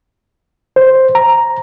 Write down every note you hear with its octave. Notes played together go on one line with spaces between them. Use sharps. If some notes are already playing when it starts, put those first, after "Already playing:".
C5
A#5